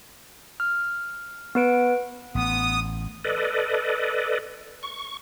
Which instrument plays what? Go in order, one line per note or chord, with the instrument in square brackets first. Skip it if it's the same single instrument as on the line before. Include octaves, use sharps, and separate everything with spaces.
[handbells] F6
B3 B4 D7
[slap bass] A1 [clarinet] B3 [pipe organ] D#6
[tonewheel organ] A4 B4 D5 D#5
C#6